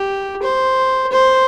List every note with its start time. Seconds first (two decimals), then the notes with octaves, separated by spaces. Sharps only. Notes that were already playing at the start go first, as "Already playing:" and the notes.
Already playing: G4
0.43 C5
1.12 C5